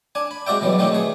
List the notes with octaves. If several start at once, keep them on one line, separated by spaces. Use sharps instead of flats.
D4 G#5
B5
G#3 C4 F#4 D5 E5 G5
B2 E3 F#3 G3
D#3 E3 A3 C4 D4 D#4
A3 G#4